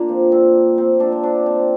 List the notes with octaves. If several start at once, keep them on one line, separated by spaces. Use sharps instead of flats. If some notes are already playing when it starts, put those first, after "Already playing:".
Already playing: A#3 D4 F4
A#2 F3 C4
C4
C4
A#2 F3 D4
C4
D4
C4